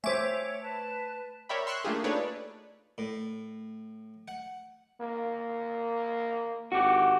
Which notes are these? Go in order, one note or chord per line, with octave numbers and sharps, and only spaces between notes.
A3 C5 C#5 E5 G#5 D6
B4 A5 F#6
A#4 C#5 D5 E5 G5 B5
C6 C#6 E6 F#6
A3 A#3 D4 F4 G4 G#4
D4 D#4 A4 B4 C#5 D5
A2
F#5
A#3
G#1 F#4 G4